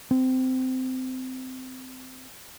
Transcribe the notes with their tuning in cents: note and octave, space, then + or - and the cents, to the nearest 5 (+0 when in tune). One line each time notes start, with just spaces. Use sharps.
C4 -20